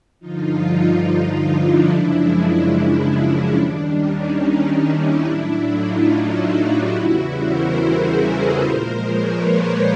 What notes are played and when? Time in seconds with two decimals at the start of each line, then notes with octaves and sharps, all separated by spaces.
0.19 G2 D3 F3 D#4 F4
1.46 D4 E4
1.88 F#2 C#3 F3 G#3 D4 E4
2.30 D4
2.73 D4
3.14 C#4
3.56 D#2 D#3 G3 D4
3.98 C#4 D#4
4.82 D4 E4
5.24 A2 F#3 D4 E4
5.66 D#4 F4
6.08 E4 F#4
6.50 F4 G4
6.92 E2 C#3 E3 G3 E4 F#4
7.34 A#4 C5
7.77 G#4 A#4
8.18 A4 B4
8.60 A#2 F3 G#3 A#4 C5
9.03 B4 C#5
9.44 C5 D5